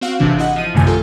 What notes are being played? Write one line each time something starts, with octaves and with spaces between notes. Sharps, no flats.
C4 F#4 F5
G#1 C3 E3 D4
E4 D#5 F#5
F3 D#7
A#1 F#2 C3 D#3 A3 G#5
F4 A4